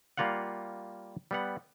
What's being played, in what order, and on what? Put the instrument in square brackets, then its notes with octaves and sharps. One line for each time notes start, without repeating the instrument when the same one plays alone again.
[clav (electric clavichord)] G3 A#3 F4 F5 F#5
G3 B3 F#5